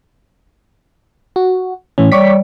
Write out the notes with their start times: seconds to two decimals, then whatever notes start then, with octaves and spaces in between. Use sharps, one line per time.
1.36 F#4
1.98 A2 E3 C#4
2.12 G3 C#5 D5 C#6 D6 B6